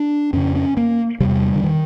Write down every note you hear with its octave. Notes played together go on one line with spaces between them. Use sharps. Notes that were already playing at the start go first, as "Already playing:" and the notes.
Already playing: D4
F2 C#3 C#4
C#4
A#3
E2 C3 G3
D3
D#3